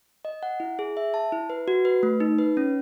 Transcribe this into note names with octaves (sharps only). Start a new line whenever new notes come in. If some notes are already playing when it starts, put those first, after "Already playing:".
D#5
F#5
E4
G#4
E5
A5
E4
B4
F#4
B4
A3
D#4
B4
C#4